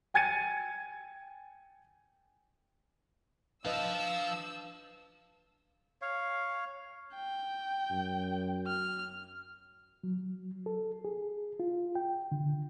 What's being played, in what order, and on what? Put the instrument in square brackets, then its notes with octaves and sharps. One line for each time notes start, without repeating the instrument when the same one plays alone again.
[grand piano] G5 G#5 G#6 A6 C#7 D#7
[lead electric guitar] F3 F5 [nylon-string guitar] D4 B4 D#5 [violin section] E6
[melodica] C#5 F5
[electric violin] G5
[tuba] F#2
[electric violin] F6
[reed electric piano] F#3
A4
G#4
F4
G5
D3